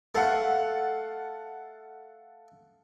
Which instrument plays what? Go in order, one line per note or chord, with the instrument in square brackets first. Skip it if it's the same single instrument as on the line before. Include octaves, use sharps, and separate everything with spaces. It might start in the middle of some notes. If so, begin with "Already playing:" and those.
[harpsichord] A3 [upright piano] A4 F5 F#5